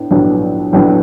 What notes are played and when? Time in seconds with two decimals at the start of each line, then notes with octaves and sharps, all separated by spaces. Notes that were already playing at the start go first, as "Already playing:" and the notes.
Already playing: A2 B3 D4
0.11 A#1 A2 F#3 B3 D4
0.73 A#1 A2 F#3 B3 D4